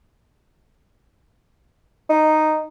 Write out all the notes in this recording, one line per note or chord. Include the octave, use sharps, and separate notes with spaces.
D#4